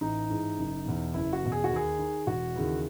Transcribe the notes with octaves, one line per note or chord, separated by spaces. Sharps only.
A1 D#4
G#2 E3
F#1
E2 B2
F#1 E4
F#4
E2 B2
G#4
F#4
D#2
G#4
D#3
E1 F#4
D#2 C#3 E3